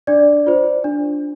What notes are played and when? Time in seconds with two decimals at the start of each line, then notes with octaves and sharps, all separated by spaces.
0.07 D4 D5
0.47 F4 C5
0.84 D4